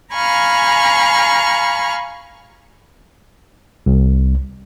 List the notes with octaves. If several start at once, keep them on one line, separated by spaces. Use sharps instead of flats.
F5 G#5 A#5 B5 C#6 F6
C2